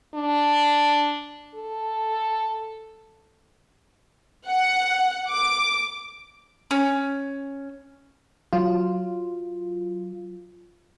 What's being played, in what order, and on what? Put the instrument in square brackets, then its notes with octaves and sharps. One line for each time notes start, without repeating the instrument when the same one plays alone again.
[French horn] D4
A4
[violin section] F#5
D6
[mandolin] C#4
[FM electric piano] F#3 F4